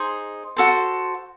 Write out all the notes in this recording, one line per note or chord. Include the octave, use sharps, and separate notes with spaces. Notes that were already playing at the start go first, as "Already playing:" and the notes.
Already playing: D#4 G#4 C5
F#4 A4 C5